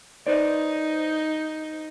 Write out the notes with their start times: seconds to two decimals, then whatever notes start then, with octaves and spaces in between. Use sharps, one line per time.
0.27 D#4 B4 C5 D5